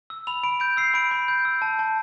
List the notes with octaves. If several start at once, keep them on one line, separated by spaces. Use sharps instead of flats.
E6
B5 F7
B5 D7
G6 D7
E6 C7
B5 D7
B5
G6
E6
A5
A5